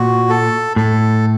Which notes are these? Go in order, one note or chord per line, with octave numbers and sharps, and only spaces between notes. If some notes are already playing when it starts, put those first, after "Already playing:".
Already playing: A#2 F#4
A4
A2 A4